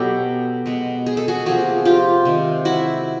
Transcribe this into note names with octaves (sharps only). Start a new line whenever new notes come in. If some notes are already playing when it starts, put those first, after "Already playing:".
Already playing: B2 F#3 B3 G4 A4
B2 G#3 B3
G#4
A4
F#4 G#4
C3 F3 A#3 F#4 G#4
F4 G4
C3 D#3 G#3
E4 F#4